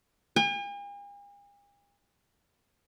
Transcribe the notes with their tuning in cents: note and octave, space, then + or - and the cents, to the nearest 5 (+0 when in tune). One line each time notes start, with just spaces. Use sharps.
G#5 -45